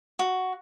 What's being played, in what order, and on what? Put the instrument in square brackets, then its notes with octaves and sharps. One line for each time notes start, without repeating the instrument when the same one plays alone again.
[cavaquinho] F#4